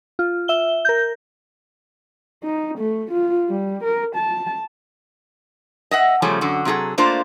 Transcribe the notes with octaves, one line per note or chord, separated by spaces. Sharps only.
F4
E5 G7
A#4 G6
D#4
A3
F4
G3
A#4
A5
D#5 E5 F#5
C#3 F3 G3 A3 C#4
F#2 D3 F#4
C3 F#3 D#4 F4 G#4 A4
A3 A#3 D4 F4 C5 F5